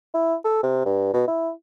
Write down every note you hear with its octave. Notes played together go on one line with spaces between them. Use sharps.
E4
A4
C3
G2
B2
E4